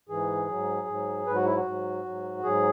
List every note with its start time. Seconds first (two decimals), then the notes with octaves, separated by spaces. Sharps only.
0.09 G#2 E3 G#4
0.48 G#2 F#3
0.87 G#2 F#3
1.26 G#2 F#3 B4
1.36 F#4
1.45 E4
1.55 F#4
1.65 G#2 F#3
2.04 G#2 F#3
2.43 G#2 F#3 G#4